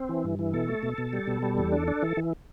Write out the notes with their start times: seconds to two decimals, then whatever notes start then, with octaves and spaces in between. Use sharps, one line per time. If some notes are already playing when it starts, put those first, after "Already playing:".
Already playing: C4
0.09 E3
0.24 G2
0.39 E3
0.53 B2 A4
0.68 A3
0.83 B2
0.98 B2
1.13 G3
1.27 B2
1.42 G3
1.58 E2
1.72 D4
1.88 D4
2.03 E3
2.17 E3